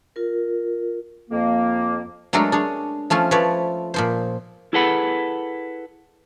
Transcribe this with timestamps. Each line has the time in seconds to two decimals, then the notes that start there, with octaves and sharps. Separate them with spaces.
0.16 F4 A#4
1.30 F2 A#3
2.33 F#3 G#3 A3 D4 A4 A#4
2.52 D4 G#4 C#5
3.10 F3 A3 C#4 F4
3.31 F3 A3 B4 C#5 D5
3.94 A#2 F3 C5
4.73 E4 G#4 A4 B4 F#5 B5